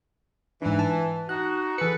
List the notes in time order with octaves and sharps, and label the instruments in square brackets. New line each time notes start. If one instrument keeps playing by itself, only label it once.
[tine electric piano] G#2 D4 [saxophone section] E3
[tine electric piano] A5
[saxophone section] D#4 F#4 [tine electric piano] F#6
[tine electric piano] E3 C#7 [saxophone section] G#4 A4 B4